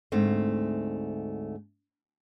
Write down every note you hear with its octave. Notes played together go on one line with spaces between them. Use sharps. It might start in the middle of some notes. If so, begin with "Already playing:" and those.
D2 G#2 A3 C4